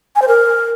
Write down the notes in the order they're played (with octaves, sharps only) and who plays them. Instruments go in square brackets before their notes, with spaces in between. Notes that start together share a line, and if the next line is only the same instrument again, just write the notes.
[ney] G#5
C5
A#4